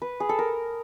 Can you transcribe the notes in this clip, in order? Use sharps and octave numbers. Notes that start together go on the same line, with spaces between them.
B4
G#4
A4
A#4